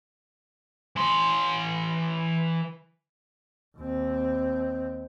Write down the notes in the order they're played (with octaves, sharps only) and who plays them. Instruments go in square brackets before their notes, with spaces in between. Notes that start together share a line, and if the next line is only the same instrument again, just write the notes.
[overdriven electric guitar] E3 C6
[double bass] D#2 C4